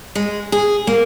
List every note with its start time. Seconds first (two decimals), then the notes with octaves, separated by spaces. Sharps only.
0.15 G#3
0.52 G#4
0.87 A#3